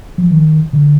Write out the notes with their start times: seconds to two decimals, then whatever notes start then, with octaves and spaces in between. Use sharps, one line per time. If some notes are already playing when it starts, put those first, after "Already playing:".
0.18 F3
0.31 D#3
0.73 D3